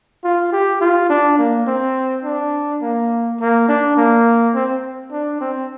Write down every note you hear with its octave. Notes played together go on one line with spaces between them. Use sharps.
F4
G4
F4
D4
A#3
C4
D4
A#3
A#3
D4
A#3
C4
D4
C4